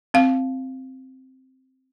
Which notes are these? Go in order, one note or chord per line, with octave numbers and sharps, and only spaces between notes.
C4 F5